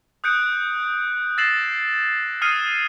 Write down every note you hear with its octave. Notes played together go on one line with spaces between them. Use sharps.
D#6 F#6 G6 C#7 D7
E6 A6 A#6 C7 E7 F#7
D#6 F6 G#6 C7 C#7 D#7